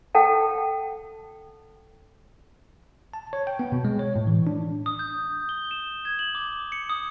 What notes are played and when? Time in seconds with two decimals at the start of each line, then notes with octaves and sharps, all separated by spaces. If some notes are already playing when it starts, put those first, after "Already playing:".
0.15 A4 F#5 G5 A5
3.14 A5
3.33 C#5
3.47 G5
3.60 B3
3.72 B2
3.85 G#3
3.99 C#5
4.15 A2
4.27 E3
4.47 D4
4.86 D#6
4.99 G6
5.49 G7
5.71 E7
6.05 G#6
6.19 F#7
6.35 D6
6.72 C#7
6.90 D#6